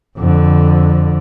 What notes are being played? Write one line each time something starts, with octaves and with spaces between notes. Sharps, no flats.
F2 D3